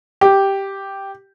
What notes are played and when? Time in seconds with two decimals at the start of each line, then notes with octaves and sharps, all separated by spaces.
0.21 G4